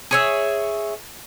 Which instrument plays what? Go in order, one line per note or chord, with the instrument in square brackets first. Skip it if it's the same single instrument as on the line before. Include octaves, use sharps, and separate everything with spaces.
[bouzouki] G#4 C#5 E5